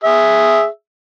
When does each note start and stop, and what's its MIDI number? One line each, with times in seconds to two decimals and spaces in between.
0.04 0.67 68
0.04 0.67 76